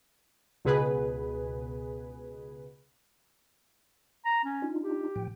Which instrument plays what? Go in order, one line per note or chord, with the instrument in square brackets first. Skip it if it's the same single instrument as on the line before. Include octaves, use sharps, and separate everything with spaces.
[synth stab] C#2 B2 G#4 B4
[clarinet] A#5
C#4
[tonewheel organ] D4 D#4 F4
[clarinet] G4
[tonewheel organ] A2 F3 G5